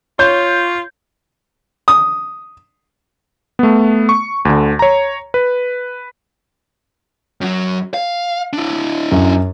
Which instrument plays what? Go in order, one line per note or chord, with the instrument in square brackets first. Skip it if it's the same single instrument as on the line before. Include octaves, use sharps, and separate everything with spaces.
[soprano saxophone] F4 [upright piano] C#5 G6
[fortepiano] D#6
[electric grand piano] A3 B3
C#6
D2 D3
C#5 A#5
B4
[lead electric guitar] F#2 F#3
F5
D4 E4
[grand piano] F#2